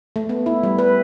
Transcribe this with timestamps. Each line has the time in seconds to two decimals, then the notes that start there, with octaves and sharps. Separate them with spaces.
0.16 A3
0.29 B3
0.46 E4
0.63 G3
0.79 B4